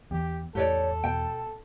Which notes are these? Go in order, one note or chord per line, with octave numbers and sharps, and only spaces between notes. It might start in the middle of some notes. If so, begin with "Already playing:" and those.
E2 G4
E2 A2 G4 A4 C#5 D5
B2 G5